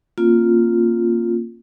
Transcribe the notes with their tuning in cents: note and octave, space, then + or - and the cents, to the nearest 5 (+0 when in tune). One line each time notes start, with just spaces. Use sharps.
A#3 +0 C#4 -40 F4 +0